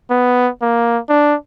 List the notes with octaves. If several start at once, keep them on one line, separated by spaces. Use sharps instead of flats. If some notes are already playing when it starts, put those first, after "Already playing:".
B3
A#3
D4